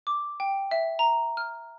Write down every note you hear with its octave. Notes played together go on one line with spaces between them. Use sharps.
D6
G5
E5
A#5
F6